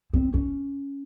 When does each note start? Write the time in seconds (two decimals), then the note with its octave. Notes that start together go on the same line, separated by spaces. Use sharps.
0.14 C4
0.34 C#4